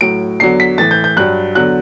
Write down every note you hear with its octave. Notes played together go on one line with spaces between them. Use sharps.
A2 F#3 D7
E2 D3 F#3 C7
B6
A2 E3 A6
G6
G6
G2 F#3 F#6
E2 D3 F#3 F#6